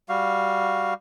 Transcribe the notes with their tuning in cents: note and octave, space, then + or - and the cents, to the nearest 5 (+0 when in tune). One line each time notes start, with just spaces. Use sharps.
G3 +0 F#4 +0 F5 +0